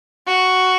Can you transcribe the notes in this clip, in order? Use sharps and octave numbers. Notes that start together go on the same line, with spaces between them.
F#4